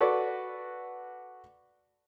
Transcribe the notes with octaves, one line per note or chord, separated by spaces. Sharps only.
F#4 A4 B4 D5